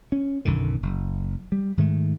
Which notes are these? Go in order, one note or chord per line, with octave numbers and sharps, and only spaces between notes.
C#4
B1 F#2 D3 D#3
F#1
G3
G#2 D#3 G#3 A3